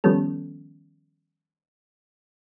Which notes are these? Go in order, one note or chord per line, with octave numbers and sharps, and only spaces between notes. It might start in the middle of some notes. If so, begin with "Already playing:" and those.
D#3 F3 G3 B3 C#4 A4